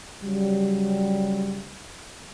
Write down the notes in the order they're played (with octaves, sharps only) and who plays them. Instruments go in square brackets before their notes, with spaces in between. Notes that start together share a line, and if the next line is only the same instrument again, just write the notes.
[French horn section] C#3 F#3 G3